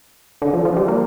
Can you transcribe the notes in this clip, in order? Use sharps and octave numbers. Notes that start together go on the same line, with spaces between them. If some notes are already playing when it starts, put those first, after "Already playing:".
D3
F3
F3
G3
A#3